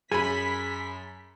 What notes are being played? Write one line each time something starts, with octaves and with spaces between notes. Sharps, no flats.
F#2 G#4 B5 B6